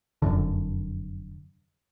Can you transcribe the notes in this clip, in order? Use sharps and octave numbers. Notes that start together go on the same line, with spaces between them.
F1 B1 F#2 D3